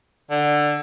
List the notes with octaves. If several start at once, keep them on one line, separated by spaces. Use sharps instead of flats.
D3